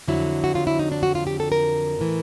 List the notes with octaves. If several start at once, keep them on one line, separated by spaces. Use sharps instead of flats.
F2 D3 F#3 E4
F#4
F4
E4
D#4
D4
F#4
F4
G4
A4
A#4
A2 E3